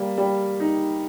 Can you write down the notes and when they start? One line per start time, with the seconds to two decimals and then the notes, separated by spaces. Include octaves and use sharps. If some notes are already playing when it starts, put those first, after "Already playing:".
Already playing: G3 A#3
0.18 G3
0.60 D#4